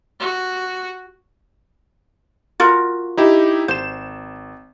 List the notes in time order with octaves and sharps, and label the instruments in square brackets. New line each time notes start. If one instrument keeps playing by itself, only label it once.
[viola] F#4
[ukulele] F4 F#4 A#4
[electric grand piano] D#4 E4 G4
[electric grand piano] G#1 E7 [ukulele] C5